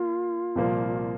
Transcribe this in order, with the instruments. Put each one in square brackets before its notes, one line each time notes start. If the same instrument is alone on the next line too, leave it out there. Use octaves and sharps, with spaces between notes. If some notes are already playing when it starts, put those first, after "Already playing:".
Already playing: [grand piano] A#3 [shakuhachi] F4
[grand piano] C2 A#2 F3 A#3